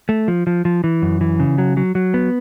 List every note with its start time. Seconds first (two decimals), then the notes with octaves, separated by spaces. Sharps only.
0.09 A3
0.28 F3
0.47 F3
0.65 F3
0.84 E3
1.02 F#2
1.21 E3
1.40 C#3
1.58 F#3
1.77 F#3
1.95 F#3
2.14 B3